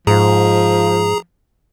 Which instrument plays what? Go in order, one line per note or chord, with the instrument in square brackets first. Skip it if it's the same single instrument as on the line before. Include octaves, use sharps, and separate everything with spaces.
[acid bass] G#2 [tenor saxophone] F3 [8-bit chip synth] G#4 A#5